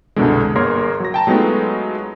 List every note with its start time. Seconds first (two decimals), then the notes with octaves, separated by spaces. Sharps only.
0.16 C2 F#2 B2 D3 G#3
0.55 G1 A#3 G#4 A#4 C#5 C6
1.00 F#3 A#6
1.14 G5 A5 A#5
1.27 F#3 G#3 A3 B3 D#4 F4